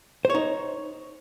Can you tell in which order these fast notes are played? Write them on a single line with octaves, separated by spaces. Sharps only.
C5 C#5 D#4